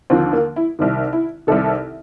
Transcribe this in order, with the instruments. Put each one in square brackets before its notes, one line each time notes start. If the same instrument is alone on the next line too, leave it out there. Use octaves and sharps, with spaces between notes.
[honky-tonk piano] D#2 D3 F3 C4
A#3
E4
C2 C3 D#3
E4
C2 C3 D#3 A4